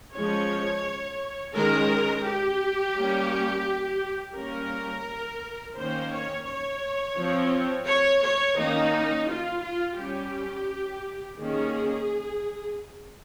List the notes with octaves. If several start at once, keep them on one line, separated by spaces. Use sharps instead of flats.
F3 G#3 C#4 C#5
D#3 G#3 C#4 A#4
G4
G3 A#3 C#4
G3 A#3 C#4 A#4
D#3 A#3 C#4 C5
C#5
C#5
F3 C4
C#5
C#5
D#3 A#3 C#4 D#4
F4
F4
G3 C#4 G4
D#3 A#3 C#4 G#4